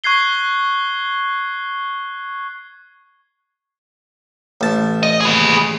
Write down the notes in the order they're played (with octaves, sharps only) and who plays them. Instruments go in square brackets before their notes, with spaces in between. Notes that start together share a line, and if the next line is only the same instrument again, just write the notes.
[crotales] C#6 F#6 G#6 C7 G7
[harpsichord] A1 A5
[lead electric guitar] D#5
G#4 B4